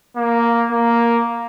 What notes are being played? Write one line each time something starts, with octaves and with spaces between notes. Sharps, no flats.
A#3
A#3